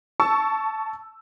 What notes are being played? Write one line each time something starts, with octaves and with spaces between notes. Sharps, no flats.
A5 C#6 E6